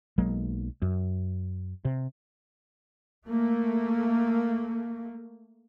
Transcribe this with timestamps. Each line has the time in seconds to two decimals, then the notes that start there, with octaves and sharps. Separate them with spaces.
0.18 B1 F#3 G#3 A#3
0.82 F#2
1.85 C3
3.25 A3 A#3